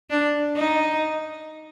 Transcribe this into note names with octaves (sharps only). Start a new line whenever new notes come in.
D4
D#4